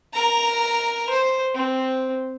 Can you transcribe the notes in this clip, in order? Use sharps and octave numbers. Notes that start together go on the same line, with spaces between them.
A#4 A#5
C5
C4